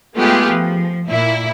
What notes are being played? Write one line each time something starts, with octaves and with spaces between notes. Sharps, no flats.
G#3 A3 B3 F4 G4 G#4
F3
A#2 E4